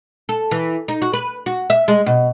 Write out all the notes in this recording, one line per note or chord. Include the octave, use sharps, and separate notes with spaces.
A4
E3
D#4
F#4
B4
F#4
E5
G#3
B2